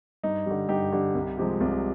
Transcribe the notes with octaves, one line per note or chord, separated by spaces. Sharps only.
G2 D#4
D3 G3
G2 D#4 G4
D3 G3
C2
C3 F3 G#3
C2